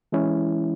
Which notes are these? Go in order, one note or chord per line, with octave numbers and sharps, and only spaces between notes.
E3 G#3 C#4 E4